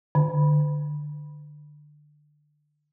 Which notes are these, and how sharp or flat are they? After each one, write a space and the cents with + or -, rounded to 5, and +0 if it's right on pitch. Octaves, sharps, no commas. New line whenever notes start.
D3 +20